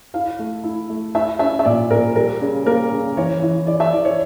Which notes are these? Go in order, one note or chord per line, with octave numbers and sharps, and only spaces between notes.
E4 F5
A3
E4
A3
E4 E5
C#4 E5
E5
A#2 D5
A#2 A#4
G3 A#4
C#3
A#3 A#4
C#3
E3 C#5
E3
E3 D5
E5
E3 D5
C#5